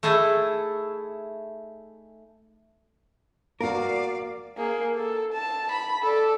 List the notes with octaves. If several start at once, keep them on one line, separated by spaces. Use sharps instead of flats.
A3 D#4 E4 G#4 A4
A#3 F#4 A#4 D5 F5
A#3 G#4
A4
A5
B5
A4 D5